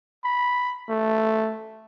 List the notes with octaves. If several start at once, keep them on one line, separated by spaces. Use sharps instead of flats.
B5
A3